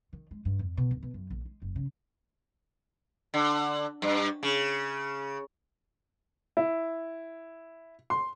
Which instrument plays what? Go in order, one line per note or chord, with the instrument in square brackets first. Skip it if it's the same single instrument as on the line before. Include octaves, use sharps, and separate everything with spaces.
[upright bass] D#3
G#3
G2
F2
B2
D1
B2
F#2
A#1
G#3
F#1
C#3
[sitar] D3
G2
C#3
[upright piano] E4
C6